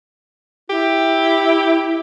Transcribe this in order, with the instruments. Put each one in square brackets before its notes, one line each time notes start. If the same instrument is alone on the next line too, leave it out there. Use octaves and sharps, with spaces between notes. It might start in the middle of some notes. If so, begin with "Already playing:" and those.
[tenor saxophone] E4 [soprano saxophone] G4